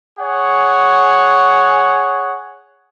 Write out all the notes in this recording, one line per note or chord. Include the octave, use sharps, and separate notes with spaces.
G#4 C#5 F#5